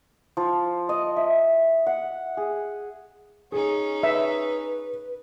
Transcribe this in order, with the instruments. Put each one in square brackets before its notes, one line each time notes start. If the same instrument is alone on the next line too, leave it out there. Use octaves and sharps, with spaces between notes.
[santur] F3
D#5
E5
F#5
G#4
[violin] C#4 D#4 [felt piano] G#4
[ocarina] B4 [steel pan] E5